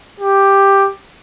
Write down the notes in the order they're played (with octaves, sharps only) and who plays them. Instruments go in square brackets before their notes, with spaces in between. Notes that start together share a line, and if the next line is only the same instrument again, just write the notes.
[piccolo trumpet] G4